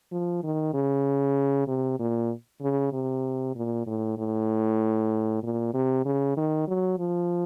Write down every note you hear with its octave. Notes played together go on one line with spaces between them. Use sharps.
F3
D#3
C#3
C3
A#2
C#3
C3
A#2
A2
A2
A#2
C3
C#3
D#3
F#3
F3